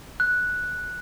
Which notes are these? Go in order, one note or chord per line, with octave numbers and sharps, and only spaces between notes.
F#6